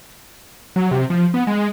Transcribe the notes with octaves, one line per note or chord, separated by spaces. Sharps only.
F#3
C3
F3
B3
G#3